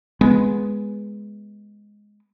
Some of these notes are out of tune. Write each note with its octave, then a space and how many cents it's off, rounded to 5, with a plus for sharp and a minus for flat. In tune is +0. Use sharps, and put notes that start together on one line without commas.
G#3 +0 B3 +0